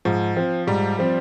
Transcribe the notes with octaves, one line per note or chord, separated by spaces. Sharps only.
G#2 F3
F3 C4
G#2 G3
F3 C4